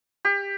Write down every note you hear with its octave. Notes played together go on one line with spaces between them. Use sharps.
G4